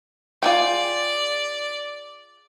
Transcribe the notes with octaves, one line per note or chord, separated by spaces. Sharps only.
F4 G#4 D5 G5